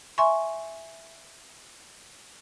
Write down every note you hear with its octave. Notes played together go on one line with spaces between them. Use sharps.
E5 G#5 C6 C#6